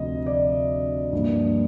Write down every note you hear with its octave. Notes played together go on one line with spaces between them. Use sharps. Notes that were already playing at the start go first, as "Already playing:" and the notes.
Already playing: D2 C3 F3 D#5
D5
G2 F3 A#3 D4